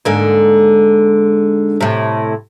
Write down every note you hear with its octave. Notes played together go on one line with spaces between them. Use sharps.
G#2 D3 A#3
A2 C3